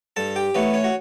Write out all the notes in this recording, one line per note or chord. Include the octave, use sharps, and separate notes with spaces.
G2 A4 A5
G4 G5
E3 A3 B3 C#4 B4
C#4 C#5
F#4